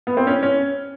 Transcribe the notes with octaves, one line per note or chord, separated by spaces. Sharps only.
B3
C4
C#4
C#4